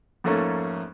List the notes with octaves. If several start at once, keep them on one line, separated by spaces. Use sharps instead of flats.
F2 G#2 A3 A#3 C#4